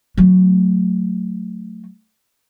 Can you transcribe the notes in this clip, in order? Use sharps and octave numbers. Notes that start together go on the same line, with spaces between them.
F#3 A3